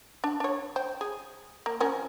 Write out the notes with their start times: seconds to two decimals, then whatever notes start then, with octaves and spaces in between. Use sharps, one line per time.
0.24 D4
0.40 D4 C#5
0.76 C5 G5
1.01 G#4
1.66 A#3
1.80 F3 C#4 A#4